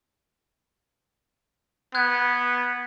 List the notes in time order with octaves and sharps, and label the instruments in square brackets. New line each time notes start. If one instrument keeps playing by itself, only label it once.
[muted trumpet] B3 [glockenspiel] F#6 G#6